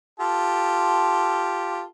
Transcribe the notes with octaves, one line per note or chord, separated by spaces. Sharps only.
F4 G4 A4